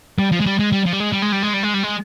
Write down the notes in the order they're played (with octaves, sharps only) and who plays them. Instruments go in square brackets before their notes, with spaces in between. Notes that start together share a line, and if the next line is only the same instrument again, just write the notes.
[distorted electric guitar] G3
F3
G#3
G3
G#3
G3
F3
G3
G#3
G3
G#3
G3
G#3
G3
G#3
G3
G#3